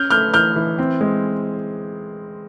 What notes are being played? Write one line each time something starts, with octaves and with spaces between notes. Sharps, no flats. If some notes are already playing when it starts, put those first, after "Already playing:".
Already playing: C#4 F6 G6
A3 F6 G6
E3 F6 G6
E3
C4
G#3